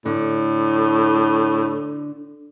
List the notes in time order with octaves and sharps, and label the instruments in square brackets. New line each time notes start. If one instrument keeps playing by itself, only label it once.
[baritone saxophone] A2 [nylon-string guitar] D3